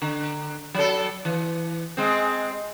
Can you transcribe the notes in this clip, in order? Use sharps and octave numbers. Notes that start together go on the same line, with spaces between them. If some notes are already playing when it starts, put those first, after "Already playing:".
D3
F#3 A4
E3
G#3 C4